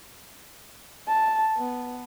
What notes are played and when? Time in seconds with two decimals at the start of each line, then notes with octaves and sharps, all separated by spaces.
1.08 A5
1.57 B3